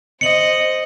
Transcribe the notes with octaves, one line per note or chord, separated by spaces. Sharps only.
C5 D#5 C#7 F#7